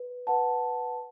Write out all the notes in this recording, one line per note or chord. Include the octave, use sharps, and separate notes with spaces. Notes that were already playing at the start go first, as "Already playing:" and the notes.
Already playing: B4
B4 F#5 A5